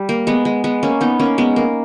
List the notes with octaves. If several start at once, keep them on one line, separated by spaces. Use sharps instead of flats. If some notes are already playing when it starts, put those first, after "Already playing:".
Already playing: G3
A#3
G#3 B3
G#3
G#3 B3
A#3 C#4
B3 D#4
A#3 C#4
G#3 B3
A#3